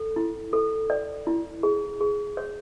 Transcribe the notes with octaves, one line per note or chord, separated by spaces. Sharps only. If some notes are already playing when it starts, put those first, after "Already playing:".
Already playing: A4
E4
A4
D5
E4
G#4
G#4
C#5